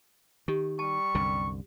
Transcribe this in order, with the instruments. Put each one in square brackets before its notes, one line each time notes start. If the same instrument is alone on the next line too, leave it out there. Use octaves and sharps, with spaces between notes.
[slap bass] D#3 [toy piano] G4
[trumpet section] G3 C#6 [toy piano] A5
[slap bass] C2 F#2 D3